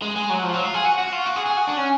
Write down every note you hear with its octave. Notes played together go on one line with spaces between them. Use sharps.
G#3
G#3
F#3
F3
F#3
F4
G#4
F#4
F#4
F4
F#4
G#4
G#4
F#4
D4
C#4